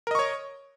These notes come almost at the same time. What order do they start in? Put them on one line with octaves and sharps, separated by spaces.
A#4 D#5 C#6 C#5